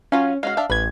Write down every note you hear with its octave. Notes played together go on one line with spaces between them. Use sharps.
F#3 C#4 F4 F5
G#3 C#4 F#4 F5
D4 E5 A5
A1 B4 G#6